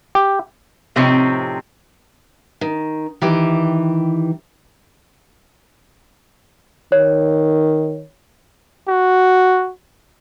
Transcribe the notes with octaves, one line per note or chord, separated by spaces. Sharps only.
G4
A2 C3 F3 C4 C#4 D#4
D#3
D#3 E3 G4
D#3 C#5
F#4